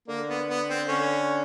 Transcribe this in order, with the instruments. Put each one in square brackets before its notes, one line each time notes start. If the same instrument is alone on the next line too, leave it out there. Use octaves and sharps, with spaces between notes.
[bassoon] D3 [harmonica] A#3
[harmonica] B3
B3
C4
[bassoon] D3 [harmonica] C#4